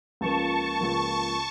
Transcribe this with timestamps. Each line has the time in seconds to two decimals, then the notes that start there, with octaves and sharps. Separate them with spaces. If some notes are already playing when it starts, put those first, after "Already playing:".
0.21 C#2 C#3 F3 A#3 A5 C#6
0.79 C#2 C#3 F3 A#3